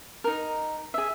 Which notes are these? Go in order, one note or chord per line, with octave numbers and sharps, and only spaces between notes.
D#4 A#4
G#4 E5